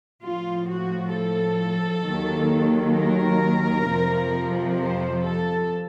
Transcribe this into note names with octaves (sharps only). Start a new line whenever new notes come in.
A2 F3 F4
F#4
A4
D#2 D#3 F#3
A#4
F2 C3 F3
C5
A4